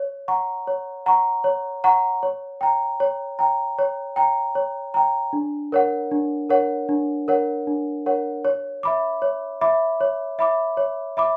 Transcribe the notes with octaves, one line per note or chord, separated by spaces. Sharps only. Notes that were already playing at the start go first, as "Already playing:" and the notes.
Already playing: C#5
F#5 A#5 C#6
C#5
F#5 A#5 C#6
C#5
F#5 A#5 C#6
C#5
G5 A#5
C#5
G5 A#5
C#5
G5 A#5
C#5
G5 A#5
D4
A#4 C#5 F#5
D4
A#4 C#5 F#5
D4
A#4 C#5 F#5
D4
A#4 C#5 F#5
C#5
E5 B5 D6
C#5
E5 B5 D6
C#5
E5 B5 D6
C#5
E5 B5 D6